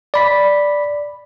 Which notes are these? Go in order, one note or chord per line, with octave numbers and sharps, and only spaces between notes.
D5 B5 B6